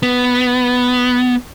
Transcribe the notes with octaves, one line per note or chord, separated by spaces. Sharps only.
B3